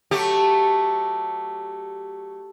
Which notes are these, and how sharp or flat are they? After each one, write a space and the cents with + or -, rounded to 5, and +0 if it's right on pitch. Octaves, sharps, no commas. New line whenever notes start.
F#3 +0 A3 +0 G4 +0